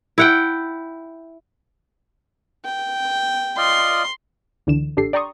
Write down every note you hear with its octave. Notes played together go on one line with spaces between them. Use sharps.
E4 F#5 G5
G5
F4 D5 D#5 C6
C#2 D3 E3 E7
A1 D4 G4 A4 C7
D5 G5 A#5 C6 C#6 D#6